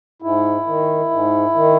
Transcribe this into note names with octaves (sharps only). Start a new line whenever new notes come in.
G#2 E4
D#3
G#2
D#3